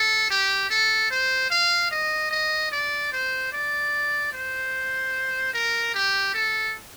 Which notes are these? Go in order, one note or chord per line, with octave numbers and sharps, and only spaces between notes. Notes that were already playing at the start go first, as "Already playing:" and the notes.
Already playing: A4
G4
A4
C5
F5
D#5
D#5
D5
C5
D5
C5
A#4
G4
A4